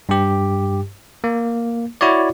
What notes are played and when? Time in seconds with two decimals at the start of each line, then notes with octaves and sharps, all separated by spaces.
0.09 G2 G4
1.24 A#3
2.01 E4 F#4 C#5 D5